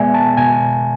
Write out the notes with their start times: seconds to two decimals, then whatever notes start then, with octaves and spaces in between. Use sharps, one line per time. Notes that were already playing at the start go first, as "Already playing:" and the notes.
Already playing: B2 G#3 B3 D5 E5 G#5
0.14 A5
0.37 B2 G#5